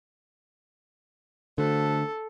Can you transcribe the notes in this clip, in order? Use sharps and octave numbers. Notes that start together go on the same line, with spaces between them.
D3 A3 F#4 A4 C5